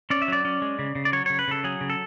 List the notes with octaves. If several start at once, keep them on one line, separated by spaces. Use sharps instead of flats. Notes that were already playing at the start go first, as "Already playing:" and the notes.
C#4 D5
E5
F#3 D5
C#4
G#3
C#3
C#3
D5
F#3 C#5
C#3 C#5
B4
C#3 A4
F#3 G#4
C#3
A4